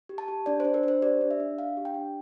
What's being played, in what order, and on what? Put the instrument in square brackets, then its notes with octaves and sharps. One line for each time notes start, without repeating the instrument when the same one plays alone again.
[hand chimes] G4
A5
G4
D4 D5
D4 C5
A#4
D4 C5
G4 D5
D4
E5
D4
D4 F5
G4
G5
D4